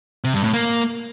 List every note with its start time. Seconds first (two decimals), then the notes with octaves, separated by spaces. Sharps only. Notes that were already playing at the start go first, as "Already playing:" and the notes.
0.24 C3
0.34 G2
0.44 A2
0.54 A#3